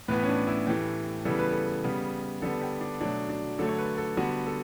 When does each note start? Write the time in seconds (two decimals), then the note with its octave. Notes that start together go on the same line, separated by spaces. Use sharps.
0.08 A2 E3 B3 B4
0.23 C#4
0.29 D4
0.47 E4
0.67 A2 E3 A3 G4
1.25 C#3 E3 G3 B3 A4
1.39 B4
1.52 A4
1.84 C#3 G3 B3
2.42 D3 G3 B3 A4
2.62 G4
2.81 D4
3.01 B2 F#3 A3 D4
3.29 D4
3.59 D3 F#3 A3 A4
3.69 C#5
3.79 B4
3.98 A4
4.17 D3 G3 B3 F#4
4.47 A4